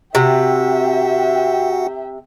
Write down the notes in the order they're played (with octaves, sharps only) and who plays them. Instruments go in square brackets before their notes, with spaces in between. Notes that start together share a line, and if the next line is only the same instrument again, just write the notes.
[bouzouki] C3 [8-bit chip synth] F#4 F#5 [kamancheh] E5 G5